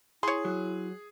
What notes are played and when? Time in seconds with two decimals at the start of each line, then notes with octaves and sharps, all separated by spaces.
0.23 E4 G#4 C#5 C6
0.45 F#3